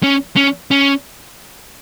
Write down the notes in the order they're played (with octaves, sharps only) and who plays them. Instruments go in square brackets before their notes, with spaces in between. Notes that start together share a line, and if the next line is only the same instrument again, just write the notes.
[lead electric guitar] C#4
C#4
C#4